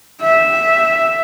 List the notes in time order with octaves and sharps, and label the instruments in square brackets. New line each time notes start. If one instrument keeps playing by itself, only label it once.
[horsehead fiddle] E5